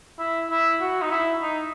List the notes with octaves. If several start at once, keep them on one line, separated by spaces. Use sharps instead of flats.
E4
E4
F#4
D#4
E4
D#4